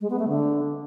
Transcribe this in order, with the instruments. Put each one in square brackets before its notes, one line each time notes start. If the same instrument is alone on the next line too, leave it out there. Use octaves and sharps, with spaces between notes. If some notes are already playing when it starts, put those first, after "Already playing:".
[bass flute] G#3
B3
A3
D3